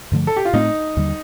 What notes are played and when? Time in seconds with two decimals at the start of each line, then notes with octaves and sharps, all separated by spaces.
0.12 G2 D3 F3 A3
0.27 A4
0.36 G4
0.45 F4
0.53 A2 A3 C4 D#4
0.97 D#2 D3 G3